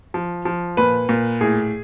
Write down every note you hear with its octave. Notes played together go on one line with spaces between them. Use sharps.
F3
F3
A#2 B4
A#2
A2 G#4